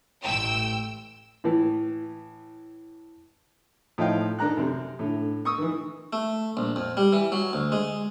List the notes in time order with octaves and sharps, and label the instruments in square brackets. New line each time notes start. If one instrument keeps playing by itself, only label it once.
[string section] A1 G5 E6
[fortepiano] A2 E3
A2 F3 D#4 D#5 F5 G5
D#3 D4 A4 A#5 F#6
F#2 C3
A2 D3
C#6 D#6 E6
D#3 E3
[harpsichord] A3
A#1
F2
G3
E3
F#3
D2
G#3